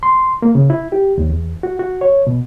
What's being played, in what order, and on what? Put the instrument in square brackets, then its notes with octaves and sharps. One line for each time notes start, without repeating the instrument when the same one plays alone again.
[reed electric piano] C6
A#3
C#3
E4
G4
D#2
E2
F#4
F#4
C#5
B2